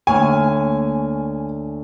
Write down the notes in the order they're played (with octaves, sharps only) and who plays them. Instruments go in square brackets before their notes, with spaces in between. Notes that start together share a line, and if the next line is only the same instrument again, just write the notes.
[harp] D2 A#3 C#5 [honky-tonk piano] G#5